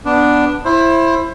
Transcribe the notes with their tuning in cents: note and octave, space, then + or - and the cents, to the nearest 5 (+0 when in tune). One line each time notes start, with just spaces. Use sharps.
B3 +5 D4 +0
E4 +15 C5 +30